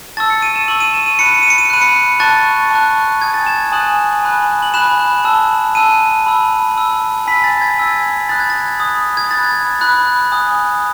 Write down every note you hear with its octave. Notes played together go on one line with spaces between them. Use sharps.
A5 C#6 E6 A6
C#7
D#7
E7
A5 C#6 E6 F#7
D#7
E7
D#7
B5 F#6 C#7
D#7
C#7
D#7
C#7
D#7
C#7
B5 F#6 D#7
C#7
A5 C#6 F#6 A6
A5 C#6 F#6
G#5 D#6 F#6 G#6
A6
E7
G#5 D#6 F#6 F#7
G#5 B5 F#6
F#7
G#5 B5 F#6 E7
A5 E6
A5 E6 D#7
B5 E6
B5 E6
G#5 B5 E6 B6
A6
G#6
G#5 B5 E6
B5 D#6 F#6 A6
G#6
A6
B5 D#6 F#6
G#6
B5 F#6 A6
B5 F#6
G#5 D#6 F#6